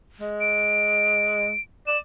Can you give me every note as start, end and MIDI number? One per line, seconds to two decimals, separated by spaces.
0.21 1.51 56
0.41 1.61 98
1.87 1.97 74
1.87 1.98 100